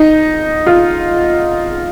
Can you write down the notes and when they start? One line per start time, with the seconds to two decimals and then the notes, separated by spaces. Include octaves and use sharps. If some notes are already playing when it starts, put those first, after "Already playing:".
Already playing: D#4
0.67 F4